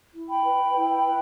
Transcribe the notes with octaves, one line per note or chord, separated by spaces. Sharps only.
E4
G5 B5
B4
E4
B4